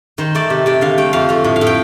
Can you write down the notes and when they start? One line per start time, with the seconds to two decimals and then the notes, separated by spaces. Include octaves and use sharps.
0.18 D#3 C5
0.35 A3 D5
0.50 C3
0.66 C3 D5
0.81 D3 F5
0.98 A3 G5
1.13 F2 F5
1.29 A3 F5
1.44 A2
1.56 F5
1.61 A2
1.67 G5